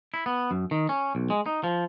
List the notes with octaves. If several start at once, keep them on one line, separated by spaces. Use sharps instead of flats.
E4
B3
F#2
D#3
C#4
B1
G#3
D#4
F3